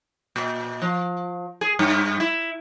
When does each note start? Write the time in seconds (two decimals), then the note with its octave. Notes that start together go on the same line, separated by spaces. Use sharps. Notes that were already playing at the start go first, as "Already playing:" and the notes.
0.36 A#2
0.82 F3
1.61 G#4
1.79 G2
2.20 E4